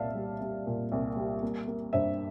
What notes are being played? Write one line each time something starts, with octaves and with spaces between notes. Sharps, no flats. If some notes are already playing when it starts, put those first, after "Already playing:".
Already playing: C2 A#2 D5 E5 F5 A5
G3
G3
A#2
C2
G3
A#3
A#3
G2 C5 E5